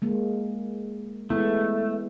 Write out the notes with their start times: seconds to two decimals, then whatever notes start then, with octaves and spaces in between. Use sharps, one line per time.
0.02 G#3 A#3
1.30 G#3 A3 B3 E4